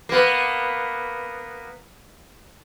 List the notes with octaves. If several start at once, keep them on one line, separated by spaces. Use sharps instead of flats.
A#3 B3